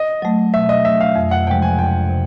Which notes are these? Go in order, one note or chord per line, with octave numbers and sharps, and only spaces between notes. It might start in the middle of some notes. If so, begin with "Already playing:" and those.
Already playing: D#5
F#3 A3
B2 E5
D#5
F#3 A3 E5
F5
F2
F#5
C3 F3 G#3 G5
G#5
F2 G5
C3